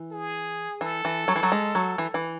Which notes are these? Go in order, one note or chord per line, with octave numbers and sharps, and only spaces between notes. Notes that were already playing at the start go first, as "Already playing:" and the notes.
Already playing: E3
G#4
E3 A4
E3
F#3
E3
F#3
G#3
F#3
E3
E3